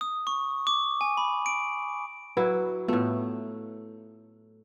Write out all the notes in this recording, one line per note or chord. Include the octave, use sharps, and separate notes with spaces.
D#6
C#6
D6
G#5
B5
D7
F#3 E4 B4
A2 A3 B3 F4